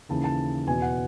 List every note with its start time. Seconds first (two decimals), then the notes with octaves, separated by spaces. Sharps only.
0.09 D#2 C#3 E3 A5
0.24 A5
0.67 E2 B2 G#5
0.82 F#5